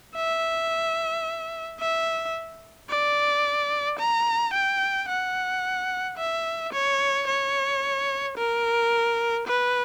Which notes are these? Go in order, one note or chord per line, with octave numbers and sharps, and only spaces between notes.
E5
E5
D5
A#5
G5
F#5
E5
C#5
C#5
A#4
B4